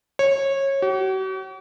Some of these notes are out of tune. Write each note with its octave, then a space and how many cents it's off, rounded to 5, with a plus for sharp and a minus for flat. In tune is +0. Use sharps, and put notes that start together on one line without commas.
C#5 -20
F#4 +45